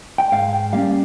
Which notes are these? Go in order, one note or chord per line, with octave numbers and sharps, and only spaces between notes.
G5
G#2 F5
G5
G3 A#3 C#4 F5